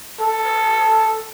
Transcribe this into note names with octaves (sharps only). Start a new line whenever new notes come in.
A4